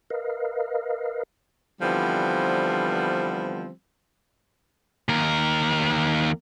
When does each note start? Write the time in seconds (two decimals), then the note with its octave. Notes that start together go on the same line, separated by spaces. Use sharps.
0.10 A#4 B4 D#5 F5
1.82 D3 E3 F3 G3 B3 C4
5.09 D#2 A#4